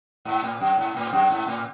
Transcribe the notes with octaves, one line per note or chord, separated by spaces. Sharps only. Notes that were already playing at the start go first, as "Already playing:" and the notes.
G#2
A2
F#2
G#2
A2
G#2
F#2
G#2
A2